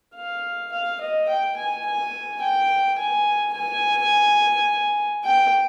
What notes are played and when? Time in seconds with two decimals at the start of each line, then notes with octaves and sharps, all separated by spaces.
0.15 F5
0.72 F5
1.01 D#5
1.28 G5
1.57 G#5
1.86 G#5
2.42 G5
2.98 G#5
3.55 G#5
5.25 G5